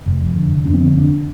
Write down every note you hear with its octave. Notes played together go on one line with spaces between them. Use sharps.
F1
F2
D3
F1
F2 D4
C4
D3
F1 D4